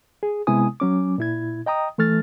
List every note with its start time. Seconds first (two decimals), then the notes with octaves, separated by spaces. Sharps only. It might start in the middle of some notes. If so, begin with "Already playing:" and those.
0.23 G#4
0.47 C3 G#3 B3 E4 G#5 D#6
0.80 F#3 C#4 D6
1.18 A#2 E4 G#6
1.66 D#5 G5 A#5 D#6
1.98 E3 A3 A4 F6 A6